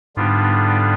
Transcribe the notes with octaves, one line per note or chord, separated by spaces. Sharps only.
G#2 D3 G3 B3 D4 F4